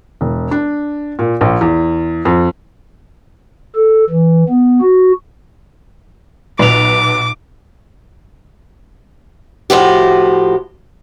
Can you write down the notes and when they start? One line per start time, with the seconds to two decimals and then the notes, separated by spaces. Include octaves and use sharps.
0.21 E1
0.51 D4
1.19 A#2
1.41 A#1
1.61 E2
2.25 F2
3.76 A4
4.10 E3
4.49 B3
4.82 F#4
6.59 B1 A#2 B4 D6 F7
9.70 A2 F3 F#4 G4